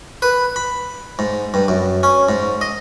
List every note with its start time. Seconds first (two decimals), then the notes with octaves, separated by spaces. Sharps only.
0.22 B4
0.56 B5
1.19 G#2
1.54 G2
1.68 F#2
2.03 C#4
2.29 G#2
2.61 D#5